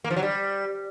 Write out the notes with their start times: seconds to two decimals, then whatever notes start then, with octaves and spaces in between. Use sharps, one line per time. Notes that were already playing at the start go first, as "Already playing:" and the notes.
0.04 A#3
0.10 F3
0.16 F#3
0.22 G3